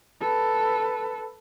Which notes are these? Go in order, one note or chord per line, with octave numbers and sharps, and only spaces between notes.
A4 B4